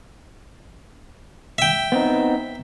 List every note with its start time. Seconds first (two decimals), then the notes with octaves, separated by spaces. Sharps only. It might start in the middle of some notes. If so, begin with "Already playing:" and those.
1.58 E5 G5
1.92 B3 C4 D#4